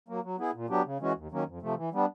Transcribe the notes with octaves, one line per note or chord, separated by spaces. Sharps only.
F#3 A#3
F#3
B3 E4 G#4
A#2
F#3 B3 D4 G4
C#3
E3 G#3 C#4 F#4
D#2
D#3 F#3 A#3 C#4
F2
C3 F3 A3
E3
G3 B3 D4